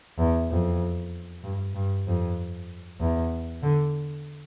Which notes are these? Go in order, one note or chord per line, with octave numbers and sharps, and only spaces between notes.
E2
F2
G2
G2
F2
E2
D3